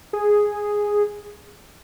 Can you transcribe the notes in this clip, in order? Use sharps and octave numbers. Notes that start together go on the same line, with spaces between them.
G#4